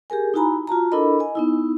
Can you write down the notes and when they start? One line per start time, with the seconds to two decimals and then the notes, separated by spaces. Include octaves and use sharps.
0.10 G4 G#4 A#4 G#5
0.34 D#4 E4 F#4 G#5 A#5 B5
0.67 F4 F#4 A5 A#5
0.92 D4 E4 A4 A#4 D#5 B5
1.19 D#5 G#5
1.35 B3 D#4 E4